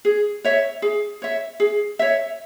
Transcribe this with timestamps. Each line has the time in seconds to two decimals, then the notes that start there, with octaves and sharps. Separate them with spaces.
0.05 G#4
0.45 C#5 E5
0.82 G#4
1.22 C#5 E5
1.60 G#4
1.99 C#5 E5